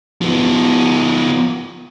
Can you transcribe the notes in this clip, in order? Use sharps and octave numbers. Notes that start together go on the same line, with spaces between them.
F3 B3